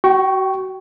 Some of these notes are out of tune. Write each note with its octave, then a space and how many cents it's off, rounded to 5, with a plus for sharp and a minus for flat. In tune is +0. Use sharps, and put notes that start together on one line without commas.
F#4 +30 G5 -20 C#6 +0